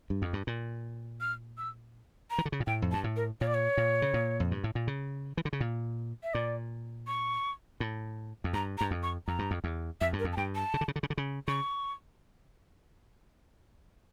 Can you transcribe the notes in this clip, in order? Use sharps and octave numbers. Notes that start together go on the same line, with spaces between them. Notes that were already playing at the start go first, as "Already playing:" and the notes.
G2
F2
G2
A#2
F6
E6
A#5
E3
D3
C#3
A#2
A2 G5
F2
G2 A5
A2
A#4
A#2 C#5
D5
C#5
A#2
C#3
A#2
F2
G2
A2
A#2
C#3
E3
D3
C#3
A#2
E5
A#2 D5
C#6
A2
F2
G2 A#5
A#5
G2
F2
C#6
F2 A#5
G2
F2
E2
F2 E5
G2
A#4
F2
A5
G2 G5
A5
C#3
D3
C#3
D3
C#3
D3
C#3
C#3 C#6